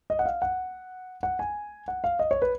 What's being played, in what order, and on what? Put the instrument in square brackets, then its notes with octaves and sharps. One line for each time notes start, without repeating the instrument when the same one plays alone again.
[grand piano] D#5
F#5
F5
F#5
F#5
G#5
F#5
F5
D#5
C#5
B4